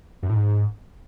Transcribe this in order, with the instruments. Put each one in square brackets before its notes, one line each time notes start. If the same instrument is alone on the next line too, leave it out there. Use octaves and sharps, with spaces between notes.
[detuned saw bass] F#2
A2
G#2